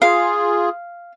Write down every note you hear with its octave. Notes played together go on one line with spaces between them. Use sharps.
F4 G#4 F5